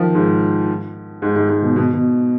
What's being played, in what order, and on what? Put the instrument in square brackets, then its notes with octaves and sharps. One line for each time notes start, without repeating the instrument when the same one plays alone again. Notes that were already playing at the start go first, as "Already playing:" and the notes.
Already playing: [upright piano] D#3 F3
G#2
G#2
G#2
G#2
B2
B2
B2